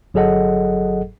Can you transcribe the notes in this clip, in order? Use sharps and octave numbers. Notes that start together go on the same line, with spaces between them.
G1 F#3 G#4 A4 D#5 F#5